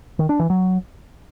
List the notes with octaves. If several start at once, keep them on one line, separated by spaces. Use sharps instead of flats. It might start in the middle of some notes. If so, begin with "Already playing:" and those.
D#3
D4
E3
F#3